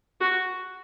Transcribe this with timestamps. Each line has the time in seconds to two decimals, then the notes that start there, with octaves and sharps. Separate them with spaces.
0.20 F#4